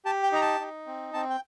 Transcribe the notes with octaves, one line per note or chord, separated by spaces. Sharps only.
G4 A5
G5
D#4 A#5
A5
D#4
C4
C4 A5
G5